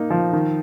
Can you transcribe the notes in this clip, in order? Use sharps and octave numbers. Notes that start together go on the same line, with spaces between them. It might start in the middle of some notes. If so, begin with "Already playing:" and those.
Already playing: A#3 D#4
F3
D#3